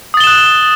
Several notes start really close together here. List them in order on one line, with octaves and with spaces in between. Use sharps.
D#6 A6 G7 E7 F#6